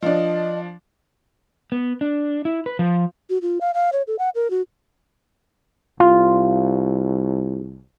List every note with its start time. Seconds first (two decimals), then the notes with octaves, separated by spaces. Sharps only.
0.02 F3 D4 D#5
1.72 B3
2.01 D4
2.45 E4
2.66 B4
2.79 F3
3.30 F#4
3.42 F4
3.61 F5
3.74 F5
3.92 C#5
4.07 A4
4.19 F#5
4.35 A#4
4.50 F#4
6.00 C2 F4